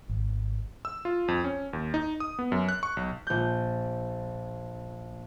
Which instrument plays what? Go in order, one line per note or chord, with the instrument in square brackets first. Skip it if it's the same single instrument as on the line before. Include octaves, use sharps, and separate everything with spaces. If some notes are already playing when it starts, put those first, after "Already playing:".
[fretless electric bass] G#1
[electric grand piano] E6
F4
F2
C#4
D#2
D#4
D#6
B3
F#2
F#6
C#6
B1
[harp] A#1 G6